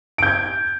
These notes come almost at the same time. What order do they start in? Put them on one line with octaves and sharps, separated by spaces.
D7 G6 G#6